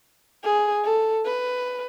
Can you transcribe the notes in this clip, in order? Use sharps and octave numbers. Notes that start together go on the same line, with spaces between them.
G#4
A4
B4